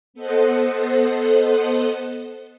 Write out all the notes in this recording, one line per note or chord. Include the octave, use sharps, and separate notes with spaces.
B3 A4 C5 D#5 F#5